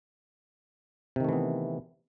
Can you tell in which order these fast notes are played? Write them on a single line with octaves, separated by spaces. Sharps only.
C3 D#3 A3 E3 B3